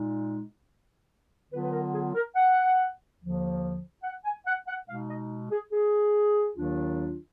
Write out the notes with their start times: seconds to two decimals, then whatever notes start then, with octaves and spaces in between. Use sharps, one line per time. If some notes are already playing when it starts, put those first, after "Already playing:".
Already playing: A#2 G#3 D#4
1.50 D3 F#3 B3 F4 B4
1.62 B4
1.72 A#4
1.93 G#4
2.14 A#4
2.35 F#5
3.19 D#2 D3 F3
4.03 F#5
4.24 G#5
4.45 F#5
4.66 F#5
4.87 B2 G#3 D#4 F5
5.08 D#5
5.50 G#4
5.72 G#4
6.55 D#2 D#3 F#3 D4 F4